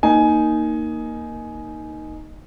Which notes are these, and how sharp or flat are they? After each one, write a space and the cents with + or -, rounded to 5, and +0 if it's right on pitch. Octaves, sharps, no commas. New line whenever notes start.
A#3 +0 D#4 +0 G#5 +15